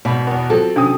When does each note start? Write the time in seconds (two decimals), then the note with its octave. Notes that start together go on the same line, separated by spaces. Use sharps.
0.05 G#1 B2 B5
0.27 E2 B3
0.50 F3 F#3 C4 A4
0.76 C3 F#3 C#4 D4 D#6